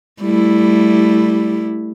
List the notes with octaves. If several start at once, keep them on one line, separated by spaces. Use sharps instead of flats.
G3 A3 E4